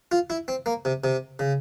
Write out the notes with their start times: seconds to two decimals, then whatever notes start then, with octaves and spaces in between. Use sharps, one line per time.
0.12 F4
0.30 E4
0.48 C4
0.66 A#3
0.85 C3
1.04 C3
1.39 C#3